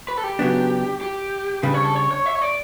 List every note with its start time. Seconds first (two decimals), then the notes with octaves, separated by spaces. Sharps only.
0.08 B4
0.17 A4
0.24 G4
0.39 C#3 F#3 B3 D4
1.01 G4
1.63 C#3 G3 D4 B4
1.74 C#5
1.84 A4
1.95 C#5
2.11 C#5
2.26 E5
2.35 C#5
2.42 D5